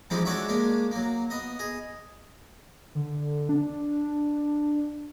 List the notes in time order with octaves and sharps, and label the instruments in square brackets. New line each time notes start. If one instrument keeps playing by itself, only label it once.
[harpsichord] E3 F3 G3 G#3 C4 D#4
G#3 D4 F#4 C#5 D5 E5
G#3 A#3 C#4 D4
F#3 A#3
B3 D#5
G#4 D#5
[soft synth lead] D3
D4